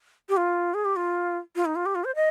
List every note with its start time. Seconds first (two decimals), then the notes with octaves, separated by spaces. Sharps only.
0.29 G4
0.37 F4
0.74 G#4
0.85 G4
0.96 F4
1.56 F4
1.65 D#4
1.76 F4
1.86 G4
1.95 F4
2.04 C5
2.15 D#5